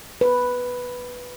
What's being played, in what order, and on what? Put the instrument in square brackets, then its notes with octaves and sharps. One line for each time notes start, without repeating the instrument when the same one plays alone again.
[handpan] B4